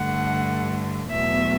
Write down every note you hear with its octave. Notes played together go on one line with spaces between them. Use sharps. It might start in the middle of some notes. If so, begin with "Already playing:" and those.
Already playing: G2 D3 A3 F#5
E2 B2 F#3 A3 E5